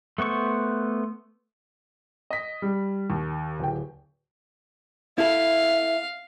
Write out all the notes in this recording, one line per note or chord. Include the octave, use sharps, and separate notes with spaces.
A3 B3 C5 C#6
D#5 B6
G3
D#2
D1 G5
E4 A4 E5 F5